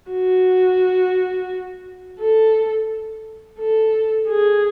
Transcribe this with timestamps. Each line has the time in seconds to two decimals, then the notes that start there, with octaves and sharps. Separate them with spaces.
0.11 F#4
2.20 A4
3.59 A4
4.29 G#4